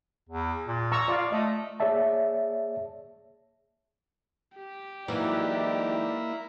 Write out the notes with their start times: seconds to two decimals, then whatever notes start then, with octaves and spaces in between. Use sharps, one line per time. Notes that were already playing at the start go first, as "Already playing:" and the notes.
0.29 E2
0.67 A#2
0.92 A#5 C#6 E6
1.08 F4 D5 F5
1.32 A3 D#5
1.80 A#3 G#4 C#5 D5 E5 A5
4.57 G4
5.08 E3 F#3 G#3 A#3 D#4 E4 D5